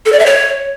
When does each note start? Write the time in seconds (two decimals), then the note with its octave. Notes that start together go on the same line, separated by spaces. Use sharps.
0.06 A4
0.13 D5
0.19 E5
0.26 C#5